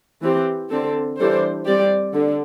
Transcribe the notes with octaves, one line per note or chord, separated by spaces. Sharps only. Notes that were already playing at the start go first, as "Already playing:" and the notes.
E3 C4 G4
D3 C4 A4
E3 G3 D4 A4 C5
G3 C4 G4 D5
D3